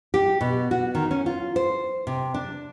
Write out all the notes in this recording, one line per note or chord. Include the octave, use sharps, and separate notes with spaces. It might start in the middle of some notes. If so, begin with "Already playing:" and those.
G4
B2
F#4
D#3
C#4
F4
C5
C3
D4